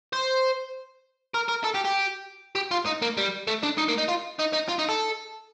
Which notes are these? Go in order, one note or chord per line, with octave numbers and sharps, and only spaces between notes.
C5
A#4
A#4
A4
G4
G4
G4
F4
D#4
A#3
G3
A3
D4
D#4
A#3
D#4
F4
D#4
D#4
F4
D#4
A4